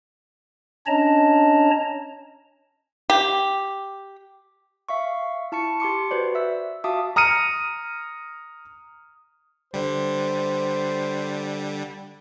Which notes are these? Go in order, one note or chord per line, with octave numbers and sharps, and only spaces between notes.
C#4 D4 C#5 D#5 A5 A#5
G4
E5 F5 C#6
E4 A5 C#6 C#7
G4 C6 D6 C#7
F#4 B4 C5 D5
E5 E6
F#4 E5 F5 A5 D6 D#6
A#5 D#6 F6 C#7 D#7
D3 G3 C5